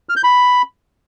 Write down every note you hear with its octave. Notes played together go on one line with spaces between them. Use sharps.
F6
G6
B5